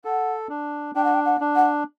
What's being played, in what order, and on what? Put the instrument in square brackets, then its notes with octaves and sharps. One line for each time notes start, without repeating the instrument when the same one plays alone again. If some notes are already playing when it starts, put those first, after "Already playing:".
[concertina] A4 [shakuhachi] F#5
[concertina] D4
[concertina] D4 [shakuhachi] G5
[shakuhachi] F#5
G5
F#5
[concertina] D4
[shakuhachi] F#5